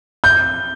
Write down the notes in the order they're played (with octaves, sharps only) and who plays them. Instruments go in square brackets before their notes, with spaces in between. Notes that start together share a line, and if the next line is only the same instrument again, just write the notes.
[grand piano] G6